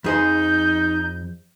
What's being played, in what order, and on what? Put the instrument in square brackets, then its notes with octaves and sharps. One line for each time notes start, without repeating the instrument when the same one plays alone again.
[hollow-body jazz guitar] F2 G#4 C5 [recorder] D#4 [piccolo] G6